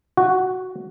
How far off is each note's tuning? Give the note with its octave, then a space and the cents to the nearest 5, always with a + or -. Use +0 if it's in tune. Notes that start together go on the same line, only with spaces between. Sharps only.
F#4 +5